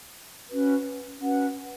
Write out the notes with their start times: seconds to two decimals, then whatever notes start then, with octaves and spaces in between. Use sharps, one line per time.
0.49 C#4 F#4 B4
1.20 C#4 F#4 B4 F#5